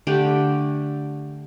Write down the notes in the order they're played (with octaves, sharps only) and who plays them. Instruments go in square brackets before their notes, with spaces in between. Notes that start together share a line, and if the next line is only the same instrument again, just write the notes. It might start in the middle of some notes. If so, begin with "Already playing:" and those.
[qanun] D3 A3 G4 G5